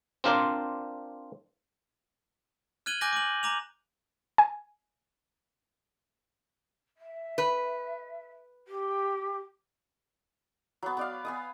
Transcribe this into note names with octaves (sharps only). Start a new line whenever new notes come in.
C4 D4 F4 A#4 C5 D5
F6 F#6 G#6 D#7 F#7 G7
G#5 D6 F#6 G6 A#6
D6 F#7
A#5 D6 F7
G#5
E5
B4
G4
F#3 B3
B3 D5 F5
B3 G#5 D#6